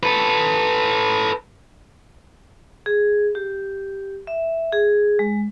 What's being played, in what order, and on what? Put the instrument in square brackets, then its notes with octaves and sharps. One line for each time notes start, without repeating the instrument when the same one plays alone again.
[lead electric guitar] A4 B4
[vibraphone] G#4
G4
E5
G#4
G#3